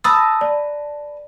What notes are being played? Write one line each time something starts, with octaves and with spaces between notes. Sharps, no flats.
B4 A5 A#5 D#6 E6 A6
D5